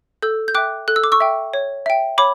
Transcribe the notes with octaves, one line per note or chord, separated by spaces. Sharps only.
A4 E6 G6
G6
E5 G5 D6 F#6
A4 F#6
E6
D6
C#6 E6
E5 G5
C#5
E5 G5
C#5 B5 D6